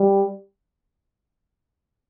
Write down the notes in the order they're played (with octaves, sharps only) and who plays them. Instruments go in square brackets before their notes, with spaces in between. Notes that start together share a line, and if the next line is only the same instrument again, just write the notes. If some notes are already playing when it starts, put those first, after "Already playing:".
Already playing: [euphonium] G3